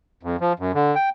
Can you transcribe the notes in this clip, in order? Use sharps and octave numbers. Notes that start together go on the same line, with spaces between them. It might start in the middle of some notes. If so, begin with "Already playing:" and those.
F2
F3
F#2
D3
G5